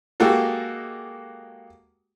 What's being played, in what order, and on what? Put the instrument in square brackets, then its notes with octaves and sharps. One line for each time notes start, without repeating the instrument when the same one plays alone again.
[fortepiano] G#3 A#3 F#4 G4 A4